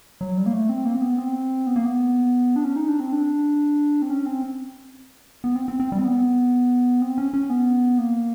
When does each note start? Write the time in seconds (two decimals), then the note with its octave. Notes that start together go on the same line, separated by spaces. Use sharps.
0.21 F#3
0.37 G3
0.46 A#3
0.53 A3
0.69 C4
0.85 A#3
0.95 C4
1.02 B3
1.18 C4
1.67 B3
1.76 A#3
1.86 B3
2.56 D4
2.64 C#4
2.76 D#4
2.88 D4
3.00 C4
3.13 D4
4.02 C4
4.10 C#4
4.26 C4
5.44 B3
5.55 C4
5.68 C4
5.80 C4
5.92 G3
5.98 C4
6.04 B3
7.02 C4
7.18 C#4
7.34 C#4
7.50 B3
7.98 A#3